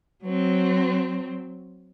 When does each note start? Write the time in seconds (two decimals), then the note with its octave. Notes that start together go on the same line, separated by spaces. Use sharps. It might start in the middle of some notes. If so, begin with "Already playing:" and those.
0.23 F#3 C4